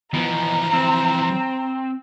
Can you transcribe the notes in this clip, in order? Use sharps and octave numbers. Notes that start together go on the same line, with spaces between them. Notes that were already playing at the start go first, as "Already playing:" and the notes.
B2 E3 F3 A#5
C4